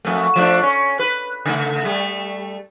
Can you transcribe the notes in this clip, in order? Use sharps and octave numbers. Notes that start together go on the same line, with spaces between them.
F2 A3
F3 A3 D4
C#4
B4
C#3 A3
G3 A3